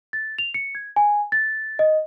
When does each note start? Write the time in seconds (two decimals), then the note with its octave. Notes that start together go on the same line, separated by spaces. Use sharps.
0.13 A6
0.38 F7
0.54 C#7
0.75 G#6
0.96 G#5
1.32 A6
1.79 D#5